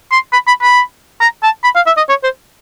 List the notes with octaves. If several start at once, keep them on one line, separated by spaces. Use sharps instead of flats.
C6
B5
B5
B5
A#5
A5
B5
F5
E5
D#5
C#5
C5